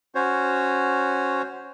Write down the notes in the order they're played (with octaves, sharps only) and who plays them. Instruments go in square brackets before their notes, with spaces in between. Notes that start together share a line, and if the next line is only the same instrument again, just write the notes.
[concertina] C#4 F#4 C5 C#5